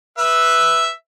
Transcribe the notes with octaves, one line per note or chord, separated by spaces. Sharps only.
B4 E5